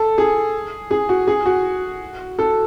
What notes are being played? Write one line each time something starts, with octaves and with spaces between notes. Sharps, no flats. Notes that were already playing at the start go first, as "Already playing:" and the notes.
Already playing: A4
G#4
G#4
F#4
G#4
F#4
A4